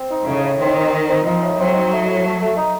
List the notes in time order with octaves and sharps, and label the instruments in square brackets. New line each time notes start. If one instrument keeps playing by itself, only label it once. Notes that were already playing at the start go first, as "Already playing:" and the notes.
Already playing: [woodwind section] C4
D#4
[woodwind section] A2 [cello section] C#3
[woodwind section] A2
[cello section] D#3 [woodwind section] C4
[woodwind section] D#4
D#4
C4
[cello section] F3 [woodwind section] D#4
[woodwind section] A2
[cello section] F#3 [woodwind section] C4
[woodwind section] D#4
A3
A2
A3
A3
D#4